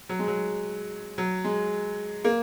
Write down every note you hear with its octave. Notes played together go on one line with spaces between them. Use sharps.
F#3
G#3
F#3
F#3
G#3
A#3